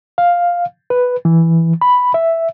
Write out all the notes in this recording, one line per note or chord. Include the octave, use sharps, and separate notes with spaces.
F5
B4
E3
B5
E5